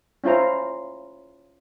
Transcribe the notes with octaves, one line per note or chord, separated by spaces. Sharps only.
C#4 E4 F4 C5 A#5